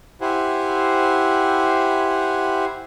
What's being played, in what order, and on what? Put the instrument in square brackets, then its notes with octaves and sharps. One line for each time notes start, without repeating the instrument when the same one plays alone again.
[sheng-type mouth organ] E4 G4 C5 F#5 G#5